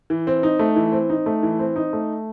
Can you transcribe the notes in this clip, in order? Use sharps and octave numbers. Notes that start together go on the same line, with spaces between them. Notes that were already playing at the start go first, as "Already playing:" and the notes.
E3
C4
D#4
A3
E3
C4
D#4
A3
E3
C4
D#4
A3